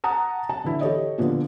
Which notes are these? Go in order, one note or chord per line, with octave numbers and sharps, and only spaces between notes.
F#5 A5 A#5 D#6
A5
D3 E3 E4
G4 A4 C#5 D#5
A#2 D3 F3 B3